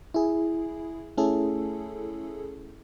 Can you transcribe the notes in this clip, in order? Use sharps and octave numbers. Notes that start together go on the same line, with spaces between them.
E4 G#4
A3 C#4 E4 G#4 A4